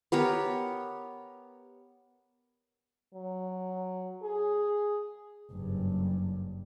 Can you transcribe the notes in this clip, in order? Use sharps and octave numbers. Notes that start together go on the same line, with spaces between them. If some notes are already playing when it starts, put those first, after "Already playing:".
B3 G4 A#4 C#5
F#3
G#4
F#1 G2